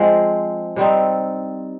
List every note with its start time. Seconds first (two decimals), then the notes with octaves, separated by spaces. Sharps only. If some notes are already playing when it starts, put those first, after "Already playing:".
Already playing: F3 G#3 C4
0.76 C3 G3 C4 D#4